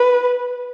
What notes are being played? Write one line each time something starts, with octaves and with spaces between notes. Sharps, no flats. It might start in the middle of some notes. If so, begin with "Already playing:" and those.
Already playing: B4